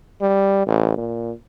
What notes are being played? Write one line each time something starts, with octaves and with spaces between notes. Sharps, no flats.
G3
A1
A#2